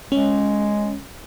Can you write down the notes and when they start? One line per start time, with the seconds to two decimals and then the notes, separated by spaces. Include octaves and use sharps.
0.12 G#3 C#4